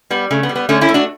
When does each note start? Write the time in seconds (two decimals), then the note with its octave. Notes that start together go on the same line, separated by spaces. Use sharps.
0.10 G3 B3
0.31 C#3 A3
0.43 B3
0.49 G3
0.56 B3
0.69 D3 A3 C#4
0.81 C#4 E4
0.89 A3
0.94 D4 F#4